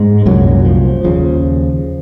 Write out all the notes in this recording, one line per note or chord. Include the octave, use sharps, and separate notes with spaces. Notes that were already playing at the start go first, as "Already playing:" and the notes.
Already playing: G#2 G#3
C2 F#2 A#2 F#3
F3
D#2 C#3 F3